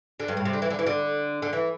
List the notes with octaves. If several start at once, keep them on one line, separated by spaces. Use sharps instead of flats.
D3
G2
A2
C3
D3
E3
D3
E3
D3
D3
E3